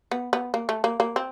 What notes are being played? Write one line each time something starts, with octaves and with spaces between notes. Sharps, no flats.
B3
B3
A#3
A3
A#3
A#3
C4